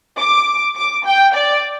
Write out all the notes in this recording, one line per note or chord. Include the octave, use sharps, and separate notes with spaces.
D6
D6
G5
D5